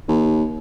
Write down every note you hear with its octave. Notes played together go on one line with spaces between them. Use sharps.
D#2